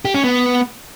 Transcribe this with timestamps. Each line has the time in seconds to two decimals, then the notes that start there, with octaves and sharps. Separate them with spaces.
0.05 G4
0.14 C#4
0.24 B3